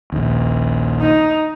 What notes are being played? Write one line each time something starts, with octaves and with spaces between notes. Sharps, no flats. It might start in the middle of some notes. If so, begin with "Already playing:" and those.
A#1 D#2
D#4